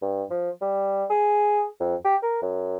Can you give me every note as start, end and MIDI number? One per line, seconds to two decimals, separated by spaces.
0.02 0.24 43
0.30 0.50 53
0.61 1.05 55
1.10 1.65 68
1.80 1.95 41
2.05 2.16 67
2.23 2.39 70
2.42 2.78 42